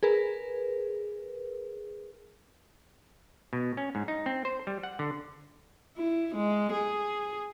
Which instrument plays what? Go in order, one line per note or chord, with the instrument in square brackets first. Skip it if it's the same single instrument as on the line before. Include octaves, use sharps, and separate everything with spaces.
[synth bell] G#4 A#4 B4
[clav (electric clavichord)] B2
C#4
G#2
D#4
C4
C5
G3
F#5
D3
[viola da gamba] E4
G#3
G#4